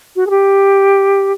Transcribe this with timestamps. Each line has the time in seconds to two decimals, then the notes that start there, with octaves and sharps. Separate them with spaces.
0.16 F#4
0.27 G#4
0.30 G4